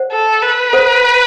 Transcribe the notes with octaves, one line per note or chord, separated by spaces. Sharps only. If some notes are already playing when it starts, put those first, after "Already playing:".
Already playing: C5 F#5
A4
B4
A4 C5 F#5